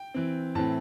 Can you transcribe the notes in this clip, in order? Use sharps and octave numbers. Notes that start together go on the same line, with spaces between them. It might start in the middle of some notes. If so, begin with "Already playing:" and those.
Already playing: G5
E3 C4
A2 E3 C4 A5